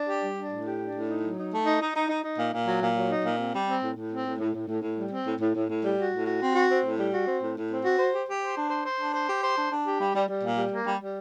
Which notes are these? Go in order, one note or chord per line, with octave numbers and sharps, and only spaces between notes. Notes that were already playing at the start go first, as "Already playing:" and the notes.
Already playing: D4
G4
G3
D4
A2
G4
D4
A2
D#4
F#3
D#4
A3
D#4
D#4
D#4
D#4
D#4
A#2
A#2
F#3
A#2
F#3
D#4
A#2
C4
G3
C4
A2
A2
C4
A2
A2
A2
A2
A2
G3
C4
A2
A2
A2
A2
G3
F#4
A2
F#4
C4
F#4
C4
A2
G3
F#4
C4
A2
A2
C4
F#4
C5
G4
G4
C5
D4
C5
C5
D4
C5
G4
C5
D4
D4
G4
G3
G3
G3
A#2
G3
A#3
G3
G3